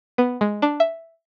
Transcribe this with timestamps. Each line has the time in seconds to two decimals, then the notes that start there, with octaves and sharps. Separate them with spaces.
0.18 B3
0.41 G#3
0.62 D4
0.80 E5